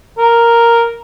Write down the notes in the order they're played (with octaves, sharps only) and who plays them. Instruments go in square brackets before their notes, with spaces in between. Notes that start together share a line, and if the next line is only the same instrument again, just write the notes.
[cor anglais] A#4